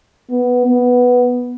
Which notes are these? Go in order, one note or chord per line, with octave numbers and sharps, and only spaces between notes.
B3
B3